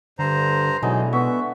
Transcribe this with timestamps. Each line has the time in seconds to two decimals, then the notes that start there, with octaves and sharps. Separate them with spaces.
0.19 G2 D3 C5 A#5
0.82 B2 D3 E3 F#3 G#3 D#4
1.13 B3 F#4 E5